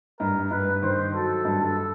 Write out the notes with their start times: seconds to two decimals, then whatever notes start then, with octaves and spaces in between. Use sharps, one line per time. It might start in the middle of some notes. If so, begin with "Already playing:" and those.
0.20 G2 A#4
0.51 G2 B4
0.82 D#3 C5
1.14 F#3 A4
1.45 G2
1.61 A4